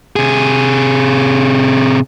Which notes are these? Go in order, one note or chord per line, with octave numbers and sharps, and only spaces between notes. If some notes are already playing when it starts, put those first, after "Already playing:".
C3 G#4